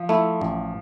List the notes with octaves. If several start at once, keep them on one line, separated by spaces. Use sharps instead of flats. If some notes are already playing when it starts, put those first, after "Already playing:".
Already playing: F3
A3 E4
A1